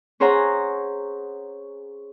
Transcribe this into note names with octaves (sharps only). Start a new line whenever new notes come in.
C#4 G#4 C5 C#5 F#5 A#5